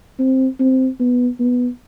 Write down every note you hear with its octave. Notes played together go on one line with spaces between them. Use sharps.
C4
C4
B3
B3